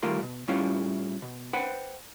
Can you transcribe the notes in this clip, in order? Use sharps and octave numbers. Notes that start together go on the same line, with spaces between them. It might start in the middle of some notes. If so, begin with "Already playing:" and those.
D#3 G3 A3 F4 A#4 C6
C2 B2
A2 G3 C#4 E4 F4 F5
B2
B4 C5 F#5 G5 B5